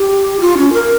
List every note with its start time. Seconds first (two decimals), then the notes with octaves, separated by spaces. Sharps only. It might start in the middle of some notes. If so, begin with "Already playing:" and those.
Already playing: G4
0.40 F4
0.57 C#4
0.73 A#4